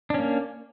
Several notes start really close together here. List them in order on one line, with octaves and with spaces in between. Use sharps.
D4 C#4 A#3